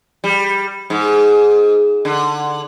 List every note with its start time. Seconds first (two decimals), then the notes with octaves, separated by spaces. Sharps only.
0.24 G3
0.90 G#2
2.05 D3